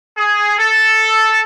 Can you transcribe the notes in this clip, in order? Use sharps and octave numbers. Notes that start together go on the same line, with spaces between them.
G#4
A4